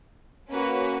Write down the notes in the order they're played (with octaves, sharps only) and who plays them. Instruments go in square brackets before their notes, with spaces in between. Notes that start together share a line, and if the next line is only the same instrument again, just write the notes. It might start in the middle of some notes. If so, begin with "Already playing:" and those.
[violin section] A#3 C#4 F#4 B4